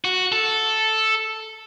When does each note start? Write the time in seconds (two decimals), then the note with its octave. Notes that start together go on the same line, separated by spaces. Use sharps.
0.05 F#4
0.32 A4